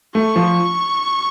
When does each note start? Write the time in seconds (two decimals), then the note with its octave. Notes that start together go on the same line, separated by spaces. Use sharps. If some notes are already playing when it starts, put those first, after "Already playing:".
0.15 A3 C#6
0.36 F3